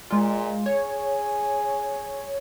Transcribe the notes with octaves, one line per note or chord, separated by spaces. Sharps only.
A#2 G#3 F4
G#4 C#5